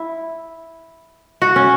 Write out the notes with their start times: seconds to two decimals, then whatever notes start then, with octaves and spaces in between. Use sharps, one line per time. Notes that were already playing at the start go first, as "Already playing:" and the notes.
Already playing: E4
1.42 F#4
1.56 C#4